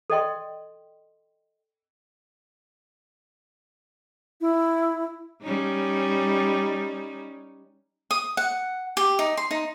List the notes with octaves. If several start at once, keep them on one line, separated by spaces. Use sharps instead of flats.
A4 D5 D#5 G5 C6
E4
G3 C#4 D#4
D#6
F#5
G4
D#4
C6
D#4